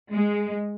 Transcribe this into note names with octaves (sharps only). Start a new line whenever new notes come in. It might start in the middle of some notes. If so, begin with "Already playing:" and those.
G#3